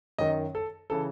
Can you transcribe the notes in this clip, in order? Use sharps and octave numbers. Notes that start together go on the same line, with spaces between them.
F#2 D#3 D#5
A4
C#3 E3 A4